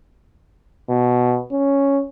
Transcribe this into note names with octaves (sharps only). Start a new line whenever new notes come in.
B2
C#4